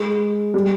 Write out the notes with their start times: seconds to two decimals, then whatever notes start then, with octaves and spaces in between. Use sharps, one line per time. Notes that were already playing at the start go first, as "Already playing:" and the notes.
Already playing: G#3
0.54 G3